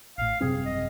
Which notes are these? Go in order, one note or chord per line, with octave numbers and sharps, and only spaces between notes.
A1 A2 F5
G#1 F#2 C3 G3 C4 G#4
D#5